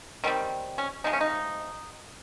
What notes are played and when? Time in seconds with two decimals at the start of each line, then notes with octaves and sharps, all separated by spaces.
0.24 D#3 G3 C4 C#4
0.78 C#4
1.04 C3 F3 G#3 D#4
1.13 C#4
1.21 D#4